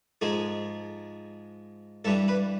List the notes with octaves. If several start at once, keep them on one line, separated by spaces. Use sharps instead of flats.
G#2 F3 G#3 G#4
G2 E3 G3 A4
B4